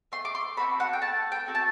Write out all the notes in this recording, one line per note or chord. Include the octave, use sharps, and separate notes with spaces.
A3 C6
D6
C6
C4 F#4 A4 B5
F#5
G5
A3 A5
G5
C4 F#4 A4
A5